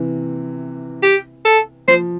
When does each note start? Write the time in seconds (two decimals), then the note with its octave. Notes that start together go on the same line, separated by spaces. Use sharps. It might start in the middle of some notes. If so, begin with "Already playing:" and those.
Already playing: C3 E3
1.03 G4
1.45 A4
1.88 F3 C5